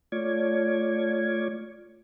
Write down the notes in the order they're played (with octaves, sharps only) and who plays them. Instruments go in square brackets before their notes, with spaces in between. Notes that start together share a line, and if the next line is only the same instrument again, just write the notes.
[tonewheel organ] A3 F4 C#5 D5 G#6